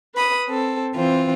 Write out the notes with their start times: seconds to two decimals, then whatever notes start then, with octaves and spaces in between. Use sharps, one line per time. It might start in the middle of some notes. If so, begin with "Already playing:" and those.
0.14 B4 B5 D#6
0.47 C4 A4
0.94 E3 C4 F4